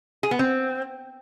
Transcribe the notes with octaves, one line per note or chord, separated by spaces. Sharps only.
G#4
B3
C4